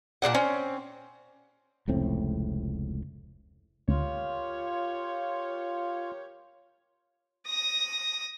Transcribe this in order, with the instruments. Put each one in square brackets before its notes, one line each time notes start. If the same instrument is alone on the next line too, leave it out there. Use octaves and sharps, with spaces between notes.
[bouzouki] A#2 C#3 D4 F#5
C4 C#4
[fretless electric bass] F1 C#2 A2 C4
[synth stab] D2 [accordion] F4 [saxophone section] G4 A#4 C#5
[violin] D#6 A#6